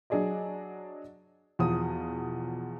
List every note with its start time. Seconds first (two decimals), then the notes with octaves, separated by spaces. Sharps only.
0.10 F#3 D4 G#4 D5 D#5
1.59 E2 B2 F3 F4 D#6